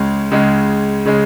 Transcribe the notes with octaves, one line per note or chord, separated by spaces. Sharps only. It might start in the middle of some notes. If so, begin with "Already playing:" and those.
Already playing: C#2 C#3 G#3
C#2 C#3 G#3
C#3 G#3